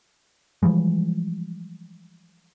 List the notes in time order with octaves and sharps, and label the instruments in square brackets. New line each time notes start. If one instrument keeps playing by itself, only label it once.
[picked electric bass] E3 F3 G3 G#3